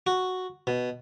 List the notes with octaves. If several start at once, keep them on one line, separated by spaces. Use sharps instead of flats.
F#4
B2